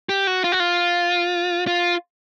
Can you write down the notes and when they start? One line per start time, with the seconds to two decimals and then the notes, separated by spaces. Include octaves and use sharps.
0.09 G4
0.27 F#4
0.44 F4
0.52 F#4
0.60 F4
1.67 F4